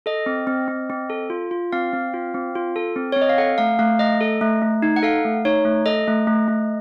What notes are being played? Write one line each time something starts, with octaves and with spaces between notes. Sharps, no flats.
A4 D#5
C4
C4
C4
C4
A4
F4
F4
C4 F5
C4
F4
C4
F4
A4
C4
C#5
C4
D#5
F5
A4 F#5
A3 F5
A3 F5
A3 D#5
A4
A3
A3
D#4
F#5
A4 F5
A3
D#4 C#5
A3
A4 D#5
A3
A3
A3